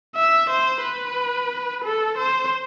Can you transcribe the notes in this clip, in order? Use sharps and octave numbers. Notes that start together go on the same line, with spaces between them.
E5
C5
B4
A4
C5